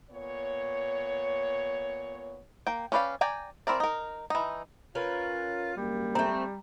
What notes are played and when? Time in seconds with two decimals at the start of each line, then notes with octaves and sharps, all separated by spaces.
0.11 A#2 B3 C#5
2.67 A#3 G5
2.92 C#4 G4 B4 D5 F5
3.21 D5 G5 G#5 A#5
3.67 C4 E4 A#4 D5
3.80 D#4 A#4
4.30 E3 D#4
4.95 C#4 F4 A#4 B4
5.77 G#1 F#2 G3 A#3
6.15 A3 C4 A#5